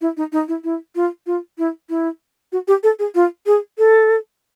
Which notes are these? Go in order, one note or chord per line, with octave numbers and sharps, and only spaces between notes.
E4
D#4
D#4
E4
E4
F4
F4
E4
E4
F#4
G4
A4
G#4
F4
G#4
A4